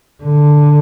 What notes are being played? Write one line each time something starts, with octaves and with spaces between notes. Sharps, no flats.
D3